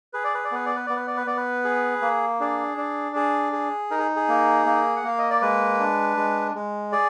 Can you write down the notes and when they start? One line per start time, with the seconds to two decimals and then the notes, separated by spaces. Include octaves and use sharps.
0.13 G#4 B4
0.24 D5
0.34 B4
0.45 D5
0.52 B3 B4
0.66 D5
0.76 B4
0.87 B3 D5
0.96 B4
1.07 D5
1.17 B4
1.27 B3 D5
1.37 B4
1.65 G#4
2.02 A#3
2.40 D4 G#4
2.77 D4
3.16 G#4
3.53 G#4
3.91 D#4 A#4
3.99 G#4
4.16 G#4
4.29 A#3
4.66 A#3
4.96 F#5
5.04 A#3 F5
5.19 D#5
5.30 D5
5.42 G#3 B4
5.80 D4
6.17 G#3
6.55 G#3
6.92 G#4 D5